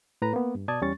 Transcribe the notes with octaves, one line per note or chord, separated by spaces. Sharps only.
A2 B4 A#5
A#3 B3
G2
B2 D5 A5 D#6 G#6
E2 G3 C#4 C#6 A6